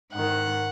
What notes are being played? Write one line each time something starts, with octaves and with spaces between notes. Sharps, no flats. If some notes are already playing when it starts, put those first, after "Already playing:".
G#2 D#3 F#5